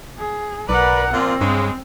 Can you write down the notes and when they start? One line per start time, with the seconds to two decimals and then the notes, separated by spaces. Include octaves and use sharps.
0.18 G#4
0.69 B1 A#4 B4 D5 F#5
1.13 A#2 F3 C4 F4
1.41 G2 C#3 G#3